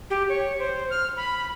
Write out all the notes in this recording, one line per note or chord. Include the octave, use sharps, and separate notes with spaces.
G4
C#5
C5
F6
B5